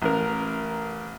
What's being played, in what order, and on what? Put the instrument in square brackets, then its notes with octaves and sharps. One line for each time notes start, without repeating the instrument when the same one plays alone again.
[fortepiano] A1 A#4